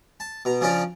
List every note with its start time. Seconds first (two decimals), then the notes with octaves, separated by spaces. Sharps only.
0.20 A5
0.45 B2 A#5
0.61 C#3 F3 C#4 D4 D5 A#5